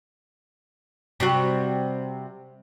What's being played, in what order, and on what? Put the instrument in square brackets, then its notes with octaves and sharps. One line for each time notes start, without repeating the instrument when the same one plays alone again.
[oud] C3 G3 F#4